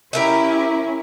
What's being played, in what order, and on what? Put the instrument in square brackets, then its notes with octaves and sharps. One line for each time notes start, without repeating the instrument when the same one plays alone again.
[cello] C#4 E4 [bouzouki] G4 A#4 E5